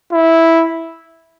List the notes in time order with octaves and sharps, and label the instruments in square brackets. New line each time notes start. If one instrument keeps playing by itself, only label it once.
[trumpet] E4